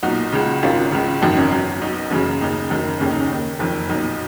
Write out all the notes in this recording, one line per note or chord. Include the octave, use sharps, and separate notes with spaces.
B1 A#2 D#4 F#4
C#2 C#3
G#1 G#2 D#3 C#4 F4
C#2 C#3
G#1 F#2 D#3 D#4
C#4
B1 B2
B1 B2 D#4
F#1 F#2 C#3 C#4
D#2 C#3 D#4
F#1 F#2 D#3
F1 D#2 C#3 C#4
D#4
C#4
D#2 D#3
F#1 F2 D#3
B1 A#2 D#4